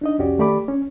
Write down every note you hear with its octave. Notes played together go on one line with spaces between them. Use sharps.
D4 D#4 D#5
C2 F2 C#4 F#4 G4 D5
D#3 A3 G4 D5 B5 D6
C#4